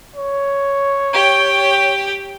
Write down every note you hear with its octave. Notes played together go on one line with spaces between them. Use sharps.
C#5
G4 G5